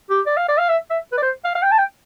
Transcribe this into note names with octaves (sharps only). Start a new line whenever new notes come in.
G4
D5
F5
D5
F5
E5
E5
B4
D5
C5
F5
F5
G5
A5
G5